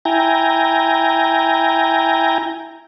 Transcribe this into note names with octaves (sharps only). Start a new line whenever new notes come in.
E4 G5 G#5 A#5